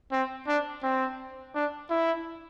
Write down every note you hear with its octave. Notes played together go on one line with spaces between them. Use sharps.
C4
D4
C4
D4
E4